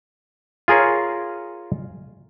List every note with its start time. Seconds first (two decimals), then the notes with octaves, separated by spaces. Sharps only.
0.68 F4 G#4 A#4 C#5